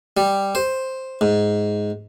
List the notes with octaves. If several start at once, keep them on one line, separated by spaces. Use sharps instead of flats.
G3
C5
G#2